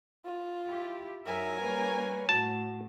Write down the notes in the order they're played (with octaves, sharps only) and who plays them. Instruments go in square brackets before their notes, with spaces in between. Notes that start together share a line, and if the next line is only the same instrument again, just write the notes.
[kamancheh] F4
[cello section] E4 G4
[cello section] F#2 D#4 E5 [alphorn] F#3 [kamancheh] A#4 G#5
[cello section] G3 A#3 C#4 [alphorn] B4
[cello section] A2 [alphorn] F#4 [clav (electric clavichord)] A5